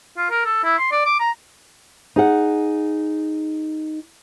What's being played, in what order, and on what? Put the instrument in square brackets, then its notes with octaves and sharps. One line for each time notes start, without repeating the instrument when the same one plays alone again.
[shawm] F4
A#4
A4
E4
C6
D5
D6
A#5
[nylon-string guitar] D#4 G#4 F#5